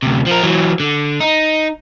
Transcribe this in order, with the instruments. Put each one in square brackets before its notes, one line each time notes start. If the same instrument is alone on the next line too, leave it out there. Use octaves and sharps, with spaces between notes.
[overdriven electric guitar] D2 C3
F3 A#4
E3 F#3
D3
D#4